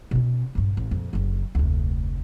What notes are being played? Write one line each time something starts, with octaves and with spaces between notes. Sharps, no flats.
B2 C#4
A#1 G2
A1
F2 A#2
F#1 D3
F1 D2